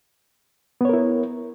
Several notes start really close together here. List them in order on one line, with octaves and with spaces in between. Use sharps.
B3 C#5 A#4 E4